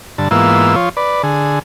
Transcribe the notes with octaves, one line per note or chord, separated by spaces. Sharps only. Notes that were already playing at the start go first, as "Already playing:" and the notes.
G2 D3 A5
G#2 E3 A#3 B3 F4 E6
F3 F4 C#5
B4 D5
D3 G#4